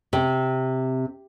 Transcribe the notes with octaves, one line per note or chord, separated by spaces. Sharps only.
C3